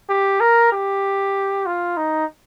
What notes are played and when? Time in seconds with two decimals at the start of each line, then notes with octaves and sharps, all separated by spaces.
0.09 G4
0.41 A#4
0.72 G4
1.66 F4
1.97 D#4